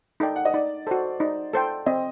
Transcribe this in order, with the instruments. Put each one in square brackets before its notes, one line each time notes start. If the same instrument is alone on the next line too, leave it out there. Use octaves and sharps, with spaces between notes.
[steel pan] D#4 A4 D5 G5
[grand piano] F#5
D#5
[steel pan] D#4 [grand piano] D5
[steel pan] F#4 A4 [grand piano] C5
[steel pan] D#4 [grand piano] D5
[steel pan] A4 C5 G5
[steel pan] C4 [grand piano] D#5